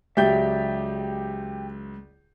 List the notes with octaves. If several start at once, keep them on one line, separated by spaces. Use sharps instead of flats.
C#2 F#3 G4 D5 E5 G6